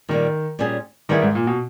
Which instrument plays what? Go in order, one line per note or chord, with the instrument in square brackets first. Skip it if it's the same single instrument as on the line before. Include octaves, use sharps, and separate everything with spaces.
[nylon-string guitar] A#2 G3 A#3 [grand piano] D#3
[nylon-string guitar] A#2 G3 C#4 G#4
[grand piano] D#3 [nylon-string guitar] G3 B3 E4 G#4
[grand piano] G#2
A#2
B2